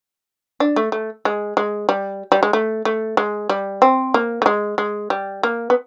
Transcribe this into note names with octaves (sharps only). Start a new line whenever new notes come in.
D4
A3
A3
G#3
G#3
G3
G3
G#3
A3
A3
G#3
G3
C4
A#3
A3
G#3
G#3
G3
A#3
B3